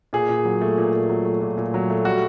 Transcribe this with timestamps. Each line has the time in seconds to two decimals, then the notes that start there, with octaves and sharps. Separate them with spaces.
0.13 A#2 G#4
0.29 A#2
0.45 F#3
0.61 A3
0.78 A#2
0.93 A#2
1.09 F#3
1.25 A3
1.41 A#2
1.57 A#2
1.74 F#3
1.90 A3
2.05 G3 F#4